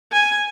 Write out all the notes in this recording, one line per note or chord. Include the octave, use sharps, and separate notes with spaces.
G#5